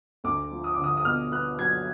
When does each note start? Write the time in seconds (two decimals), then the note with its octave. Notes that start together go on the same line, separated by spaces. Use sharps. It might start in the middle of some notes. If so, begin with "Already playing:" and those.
0.24 D2 D6
0.51 F3
0.64 D#6
0.74 D3 D6
0.84 D#6
0.97 D#6
1.05 B2 F6
1.32 B3 F#6
1.58 F#3 G#6